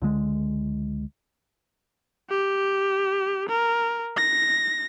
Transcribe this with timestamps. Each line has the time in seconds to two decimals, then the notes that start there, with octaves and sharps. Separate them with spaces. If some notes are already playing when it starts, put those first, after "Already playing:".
0.02 C#2 D3 G#3
2.30 G4
3.49 A#4
4.17 A#6